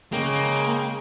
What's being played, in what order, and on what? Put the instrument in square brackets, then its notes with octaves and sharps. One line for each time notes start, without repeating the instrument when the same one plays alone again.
[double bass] C#3 [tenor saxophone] G#3 [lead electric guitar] A#3 [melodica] G5